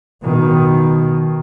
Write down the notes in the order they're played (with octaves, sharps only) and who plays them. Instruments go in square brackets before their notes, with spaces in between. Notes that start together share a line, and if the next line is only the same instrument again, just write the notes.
[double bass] B2 D#3